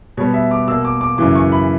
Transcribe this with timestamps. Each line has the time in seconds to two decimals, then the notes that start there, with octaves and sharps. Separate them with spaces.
0.17 B2 G3 B3 C#5
0.34 E5
0.51 D6
0.68 B2 A#3 E6
0.85 D6
1.01 D6
1.18 F#2 C#3 E3 D6
1.35 C#6
1.52 B5